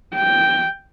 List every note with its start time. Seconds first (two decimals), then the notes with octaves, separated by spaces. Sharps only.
0.15 G5